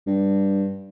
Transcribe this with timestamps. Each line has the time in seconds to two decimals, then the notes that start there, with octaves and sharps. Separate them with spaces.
0.07 G2